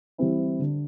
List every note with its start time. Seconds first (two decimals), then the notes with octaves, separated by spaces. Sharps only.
0.18 E3 G3 C4 E4
0.59 D3